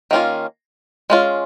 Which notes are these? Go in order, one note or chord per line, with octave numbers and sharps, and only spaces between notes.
D#3 A#3 C#4 F4
G#3 C#4 F4